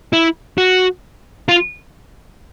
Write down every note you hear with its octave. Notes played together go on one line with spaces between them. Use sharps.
E4
F#4
F4